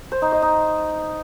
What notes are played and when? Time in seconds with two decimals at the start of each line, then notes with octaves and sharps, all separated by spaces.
0.12 C5
0.22 D#4
0.32 D#5
0.42 D#4